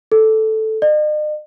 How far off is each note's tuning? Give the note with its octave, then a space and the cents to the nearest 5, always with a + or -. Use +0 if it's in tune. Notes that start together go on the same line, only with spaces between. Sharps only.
A4 -5
D#5 -45